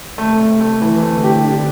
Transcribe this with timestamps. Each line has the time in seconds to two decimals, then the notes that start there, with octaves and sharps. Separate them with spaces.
0.18 C3 A3
0.39 A3
0.61 A3
0.81 E3
1.02 D3 A3
1.23 G4
1.45 D4